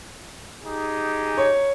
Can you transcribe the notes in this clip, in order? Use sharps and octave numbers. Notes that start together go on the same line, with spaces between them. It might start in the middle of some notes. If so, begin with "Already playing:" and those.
D#4 G4 G#4
C#5